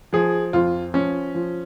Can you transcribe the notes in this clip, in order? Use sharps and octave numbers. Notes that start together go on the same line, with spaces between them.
F3 G#4
F2 F4
F3 C#4
F3